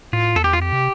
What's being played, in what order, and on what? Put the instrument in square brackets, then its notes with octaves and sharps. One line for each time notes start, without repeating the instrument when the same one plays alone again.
[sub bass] A2 [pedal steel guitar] F4
[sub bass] E2 [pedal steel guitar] A4
[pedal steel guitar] G4
F4
[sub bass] F2 [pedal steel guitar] G4
[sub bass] C3